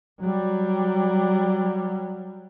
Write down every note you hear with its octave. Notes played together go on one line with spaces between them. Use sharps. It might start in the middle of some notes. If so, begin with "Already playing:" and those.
F#3 G3